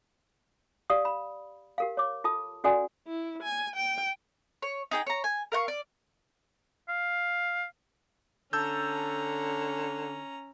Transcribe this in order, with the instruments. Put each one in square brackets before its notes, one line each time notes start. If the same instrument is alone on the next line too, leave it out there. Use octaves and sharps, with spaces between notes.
[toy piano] G4 D5 F5 D#6
B5
G4 A#4 F5
C#5 D6
F4 A4 A5 D#6
C#4 F#4 A4 D5 F#5 G#5
[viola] E4
G#5
G5
[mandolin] C#5
D#4 G#4 G5
C#5 A#5
G#5
A#4 F5 F#5 C#6
D5
[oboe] F5
[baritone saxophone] D3 [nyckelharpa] C#4 A#5 [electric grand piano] A5 E6 G6